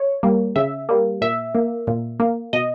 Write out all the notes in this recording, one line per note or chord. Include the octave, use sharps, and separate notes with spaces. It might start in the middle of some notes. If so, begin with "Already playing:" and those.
Already playing: C#5
G3 A#3
C#3 E5
G3 A#3
A#2 E5
A#3
A#2
A#3
B2 D#5